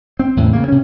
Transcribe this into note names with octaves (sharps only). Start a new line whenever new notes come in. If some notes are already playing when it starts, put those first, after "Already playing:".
C4
E2 A2 C#3
C#3 A#3
C3 C#4